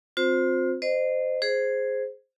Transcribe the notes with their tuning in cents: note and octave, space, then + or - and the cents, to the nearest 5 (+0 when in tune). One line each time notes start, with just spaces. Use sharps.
C4 +5 F4 +40 C5 +0
C5 -15 D#5 -30
G#4 +5 C5 +0